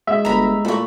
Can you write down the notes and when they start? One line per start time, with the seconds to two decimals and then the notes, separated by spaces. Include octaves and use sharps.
0.07 G#3 E5 E6
0.25 G1 A#5 B5
0.65 A#2 A3 A4 B5 C#6